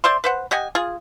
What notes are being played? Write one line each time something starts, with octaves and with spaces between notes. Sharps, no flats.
C5 D5 E5 C6
B4 C5 F#5
G4 D#5 F#5 G#5
F4 G#4